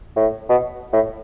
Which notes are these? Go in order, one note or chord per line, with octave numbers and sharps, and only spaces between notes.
A2
B2
A2